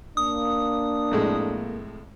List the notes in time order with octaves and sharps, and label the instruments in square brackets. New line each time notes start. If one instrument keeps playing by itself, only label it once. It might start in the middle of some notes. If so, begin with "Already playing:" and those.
[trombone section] A#3 [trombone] D4 [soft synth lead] D#6
[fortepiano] F2 A2 G#3